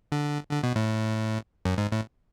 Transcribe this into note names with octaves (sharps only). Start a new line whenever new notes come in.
D3
D3
B2
A2
F#2
G#2
A2